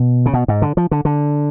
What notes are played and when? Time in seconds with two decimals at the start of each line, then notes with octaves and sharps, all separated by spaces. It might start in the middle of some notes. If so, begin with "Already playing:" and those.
Already playing: B2
0.26 C#3
0.33 B2
0.48 G#2
0.62 D3
0.77 F3
0.91 D3
1.05 D3